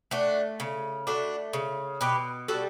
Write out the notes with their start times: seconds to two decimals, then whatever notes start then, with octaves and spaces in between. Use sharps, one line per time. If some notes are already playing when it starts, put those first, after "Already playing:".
0.11 A3 D4 F#4
0.60 C#3
1.07 A3 D4 F#4
1.53 C#3
2.01 B2 G4 B4
2.48 G3 F#4 A4